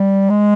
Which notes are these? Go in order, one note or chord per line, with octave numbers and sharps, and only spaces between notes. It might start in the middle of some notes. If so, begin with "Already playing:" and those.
Already playing: G3
G#3